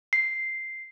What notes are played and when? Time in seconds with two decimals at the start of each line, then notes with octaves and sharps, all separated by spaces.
0.13 C7